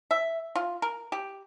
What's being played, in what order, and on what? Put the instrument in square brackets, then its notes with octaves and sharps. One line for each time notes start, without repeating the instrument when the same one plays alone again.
[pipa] E5
F4
A#4
G4